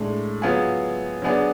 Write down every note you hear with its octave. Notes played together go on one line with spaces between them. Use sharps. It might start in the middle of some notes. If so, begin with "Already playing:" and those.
Already playing: A2 G#3 D4
F#3 B3 F4 G#4
F#3 B3 D4 G#4 D5